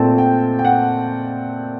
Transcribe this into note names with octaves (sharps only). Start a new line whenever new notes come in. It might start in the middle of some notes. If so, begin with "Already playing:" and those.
Already playing: A#2 A3 C4 G5 A5
G5
G5
F#5